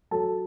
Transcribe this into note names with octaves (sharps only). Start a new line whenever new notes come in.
F#3 A4 A5